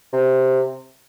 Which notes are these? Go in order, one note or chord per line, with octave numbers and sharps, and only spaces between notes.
C3